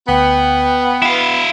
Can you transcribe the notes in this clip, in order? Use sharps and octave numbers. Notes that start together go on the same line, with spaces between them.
D2 B3 G5
E4 F5 B5